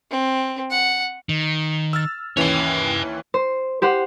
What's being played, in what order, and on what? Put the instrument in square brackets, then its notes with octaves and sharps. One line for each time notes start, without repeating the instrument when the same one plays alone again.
[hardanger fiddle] C4
F#5
[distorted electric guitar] D#3
[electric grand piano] E6 F6 A6
[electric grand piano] D#2 E3 C#4 [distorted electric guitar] C#5 G5
[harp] C5
G4 C5 F#5